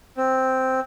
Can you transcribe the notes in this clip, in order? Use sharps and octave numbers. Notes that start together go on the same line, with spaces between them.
C4